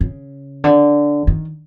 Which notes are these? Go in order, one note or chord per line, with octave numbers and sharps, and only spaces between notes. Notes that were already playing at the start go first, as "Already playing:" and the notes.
C#3
D3
D#3